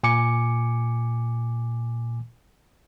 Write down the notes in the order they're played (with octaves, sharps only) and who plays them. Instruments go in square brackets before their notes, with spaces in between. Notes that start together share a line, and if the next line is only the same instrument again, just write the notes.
[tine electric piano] A#2 G#5 D6 C#7